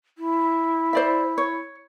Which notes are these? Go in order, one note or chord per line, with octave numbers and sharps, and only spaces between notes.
E4
C5 D5 E5
C#5